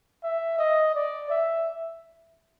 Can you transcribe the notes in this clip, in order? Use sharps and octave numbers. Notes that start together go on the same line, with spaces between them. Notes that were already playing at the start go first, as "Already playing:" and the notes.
E5
D#5
D5
E5